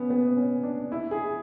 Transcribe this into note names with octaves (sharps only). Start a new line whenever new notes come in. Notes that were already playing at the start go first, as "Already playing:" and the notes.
Already playing: B3 C#4
B3
C#4
D4
E4
G#4